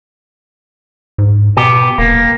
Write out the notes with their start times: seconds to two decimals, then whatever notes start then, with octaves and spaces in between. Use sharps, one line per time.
1.18 G#2
1.57 B2 B3 G4
1.98 D#1 A#3